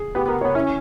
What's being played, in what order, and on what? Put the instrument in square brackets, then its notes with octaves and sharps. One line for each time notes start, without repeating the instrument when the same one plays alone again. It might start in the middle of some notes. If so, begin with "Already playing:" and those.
Already playing: [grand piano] G#4
[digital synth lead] B3 [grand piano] G4
[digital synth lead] B3 [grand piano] A#4
[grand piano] C#5
[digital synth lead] B3
[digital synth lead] C#4 [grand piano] E4